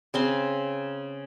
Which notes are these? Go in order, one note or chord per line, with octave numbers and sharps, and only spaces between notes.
C#3 C4 C6